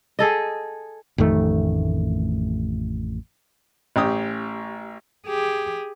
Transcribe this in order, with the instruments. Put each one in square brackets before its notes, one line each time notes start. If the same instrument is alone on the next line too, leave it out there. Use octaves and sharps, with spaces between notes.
[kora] G#4 A4 D#5
[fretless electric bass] A1 F2 D#3 A3
[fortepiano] A1 C#4 G4 D#6
[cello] G4 G#4